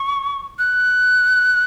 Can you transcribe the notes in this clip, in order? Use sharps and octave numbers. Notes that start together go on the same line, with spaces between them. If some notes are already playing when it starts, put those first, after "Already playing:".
Already playing: C#6
F#6